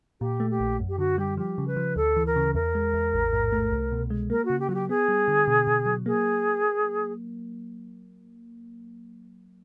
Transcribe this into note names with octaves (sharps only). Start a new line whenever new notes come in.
A#2 G4
A3
G4
A#1
F#2
G4
D3 F#4
G3 G4
F3 G4
C#3
B4
F3
D2 A4
E3
A#4
C#3
E2 A#4
G#3
E2
A1
G#2
A3
C2
B2
G#3
A#3 A#4
C#3 F#4
G4
F#3 F#4
G4
B3 G#4
G3
D3
B2
B2
F#3
A#3 G#4